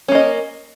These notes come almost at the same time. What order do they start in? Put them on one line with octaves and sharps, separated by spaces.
C#4 A#3 D#5